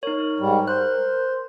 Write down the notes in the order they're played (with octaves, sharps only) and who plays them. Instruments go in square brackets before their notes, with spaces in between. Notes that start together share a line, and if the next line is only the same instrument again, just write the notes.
[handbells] D#4 C#5 [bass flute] A#4
[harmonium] G#2 G3
[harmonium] C5 [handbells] F#6